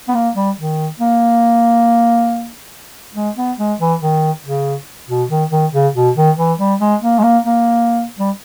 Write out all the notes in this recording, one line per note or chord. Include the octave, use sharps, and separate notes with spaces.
B3
A#3
G3
D#3
A#3
G#3
B3
G#3
E3
D#3
C#3
B2
D#3
D#3
C#3
B2
D#3
E3
G3
G#3
A#3
G#3
A#3
A#3
G3